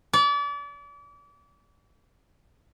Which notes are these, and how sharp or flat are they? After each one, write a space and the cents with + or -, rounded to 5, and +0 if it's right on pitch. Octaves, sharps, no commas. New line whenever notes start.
D5 -35